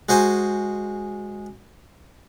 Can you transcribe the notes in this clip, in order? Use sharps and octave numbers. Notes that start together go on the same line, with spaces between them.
G#3 F#4 C5 G#5